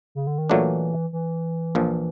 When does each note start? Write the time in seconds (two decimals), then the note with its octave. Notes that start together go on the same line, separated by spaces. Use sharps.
0.15 C#3
0.27 D3
0.38 D#3
0.50 A#2 E3 F#3 A3 D4
1.13 E3
1.75 A#1 A#2 F3